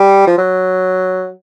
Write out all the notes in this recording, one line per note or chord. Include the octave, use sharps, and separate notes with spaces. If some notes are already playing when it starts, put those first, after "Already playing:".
Already playing: G3
F3
F#3